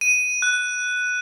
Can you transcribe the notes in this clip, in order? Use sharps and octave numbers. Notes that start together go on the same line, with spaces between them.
D#7
F#6